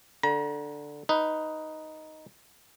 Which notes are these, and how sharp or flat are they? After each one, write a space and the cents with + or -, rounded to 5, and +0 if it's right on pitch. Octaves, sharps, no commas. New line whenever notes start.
D3 +0 A#5 +35
D#4 +0 B4 +0